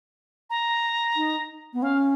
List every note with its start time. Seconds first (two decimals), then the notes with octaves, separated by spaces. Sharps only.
0.50 A#5
1.16 D#4
1.73 B3
1.82 C#4 F5